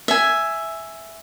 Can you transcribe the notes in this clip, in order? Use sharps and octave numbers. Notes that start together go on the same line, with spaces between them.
E5 G#5